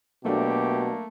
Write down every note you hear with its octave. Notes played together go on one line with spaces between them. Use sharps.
B2 F#3 A3 A#3 D4 G4